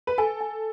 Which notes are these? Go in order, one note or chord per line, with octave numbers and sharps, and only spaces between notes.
B4
A4 G#5
G#5